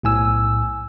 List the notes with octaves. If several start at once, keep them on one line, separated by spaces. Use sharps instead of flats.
B1 A2 G#5 E6